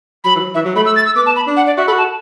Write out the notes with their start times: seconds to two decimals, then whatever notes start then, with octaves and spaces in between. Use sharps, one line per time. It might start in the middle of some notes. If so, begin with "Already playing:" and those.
0.24 F#3 B5
0.35 E3
0.39 F#3
0.55 E3 E5
0.65 F#3
0.76 A3 B5
0.86 E6
0.96 A6
1.06 E6
1.16 B3 D6
1.26 A5
1.36 B5
1.47 D4
1.56 F#5
1.66 D5
1.77 F#4 E5
1.87 A4 B5
1.92 F#4
1.98 A5